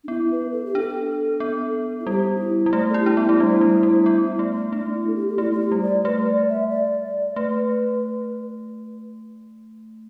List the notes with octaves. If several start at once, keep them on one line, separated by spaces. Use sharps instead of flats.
D4
B3 E4
B4
A4
G4
D4 A4
B3
E4
G3 G4
D4
E4
G3
A3
A4
E4 G4
D4
B3 E4
A3 D4
G3
E4
G3
G3
B3
A3
A3 D4
E4
A4
G4
G4
A3 E4
E4
G4
G3
D5
A3 B4
D5
E5
D5
D5
A3 B4